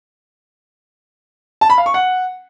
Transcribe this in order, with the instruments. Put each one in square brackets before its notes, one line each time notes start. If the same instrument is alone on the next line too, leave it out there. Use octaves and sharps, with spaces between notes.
[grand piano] A5
B5
F5
C#6
F#5